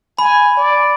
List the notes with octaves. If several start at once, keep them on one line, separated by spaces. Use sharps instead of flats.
G#5 B5
D5